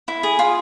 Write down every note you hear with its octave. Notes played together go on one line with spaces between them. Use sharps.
E4
G#4
F4